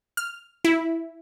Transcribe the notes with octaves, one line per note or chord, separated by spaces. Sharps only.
F6
E4